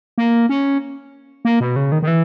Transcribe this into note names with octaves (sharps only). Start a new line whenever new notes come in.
A#3
C#4
A#3
B2
C#3
D#3
D#3
E3